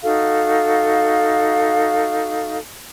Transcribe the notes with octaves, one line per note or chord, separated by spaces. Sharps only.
D#4 F#4 A4 F5